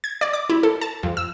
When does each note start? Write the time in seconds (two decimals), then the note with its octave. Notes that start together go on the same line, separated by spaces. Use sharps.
0.04 G#6
0.21 D5
0.33 D6
0.50 E4
0.63 A4
0.81 A5
1.03 F2
1.17 E6